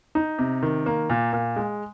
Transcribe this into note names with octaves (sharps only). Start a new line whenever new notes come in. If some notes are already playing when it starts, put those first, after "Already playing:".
D#4
C3
D#3
A#3
A#2
A#2
G#3